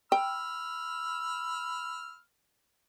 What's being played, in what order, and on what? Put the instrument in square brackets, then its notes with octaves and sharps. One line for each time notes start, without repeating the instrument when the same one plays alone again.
[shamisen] G5 [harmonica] B5 E6 F6